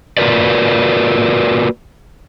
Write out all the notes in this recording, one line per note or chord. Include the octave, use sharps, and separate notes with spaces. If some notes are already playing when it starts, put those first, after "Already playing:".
A#3 F4 F#4 A#4 B4 D5